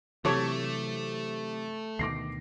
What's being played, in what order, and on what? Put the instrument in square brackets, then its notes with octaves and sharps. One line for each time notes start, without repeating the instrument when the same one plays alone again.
[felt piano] C3 G4 D6 [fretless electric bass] E3 F#3 [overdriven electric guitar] A3 [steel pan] A4 C#5
[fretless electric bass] D2 B2 D#3 [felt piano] D6 A#6 C7